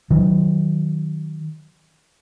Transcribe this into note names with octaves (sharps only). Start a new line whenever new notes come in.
D#3 F#3